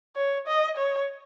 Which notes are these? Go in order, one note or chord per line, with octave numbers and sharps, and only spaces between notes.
C#5
D#5
C#5